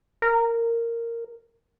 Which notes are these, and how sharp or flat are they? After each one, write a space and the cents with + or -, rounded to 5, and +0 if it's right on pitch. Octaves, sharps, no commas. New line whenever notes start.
A#4 -10